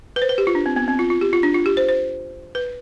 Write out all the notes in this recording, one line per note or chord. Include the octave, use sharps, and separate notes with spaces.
B4
C5
B4
G4
F4
D4
C4
B3
C4
F4
F4
G4
F4
D4
F4
G4
C5
C5
B4